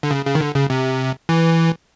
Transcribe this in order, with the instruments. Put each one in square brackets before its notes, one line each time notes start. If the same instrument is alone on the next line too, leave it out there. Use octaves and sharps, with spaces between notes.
[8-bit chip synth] D3
C#3
C#3
D#3
D3
C#3
C3
E3